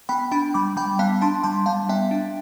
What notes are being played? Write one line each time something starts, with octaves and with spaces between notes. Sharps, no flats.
B3 G5 B5
D4 G5 B5
G3 B5 D6
G3 G5 B5
B3 F5 A5
D4 A5 C6
G3 A5 C6
G3 F5 A5
B3 E5 G5
D4